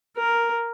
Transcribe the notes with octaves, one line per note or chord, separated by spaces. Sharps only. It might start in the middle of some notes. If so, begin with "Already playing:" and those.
A#4